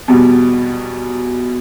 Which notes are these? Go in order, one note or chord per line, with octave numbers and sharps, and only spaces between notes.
E2 B2 G3